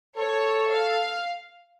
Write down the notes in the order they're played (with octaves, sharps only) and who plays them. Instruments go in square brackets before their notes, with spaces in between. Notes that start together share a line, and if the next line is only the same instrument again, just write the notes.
[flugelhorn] A4 [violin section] C#5
[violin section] F5